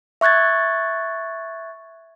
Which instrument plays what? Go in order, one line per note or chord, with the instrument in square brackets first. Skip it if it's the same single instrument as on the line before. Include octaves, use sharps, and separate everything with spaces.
[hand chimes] E5 C#6 F#6 G#6 A6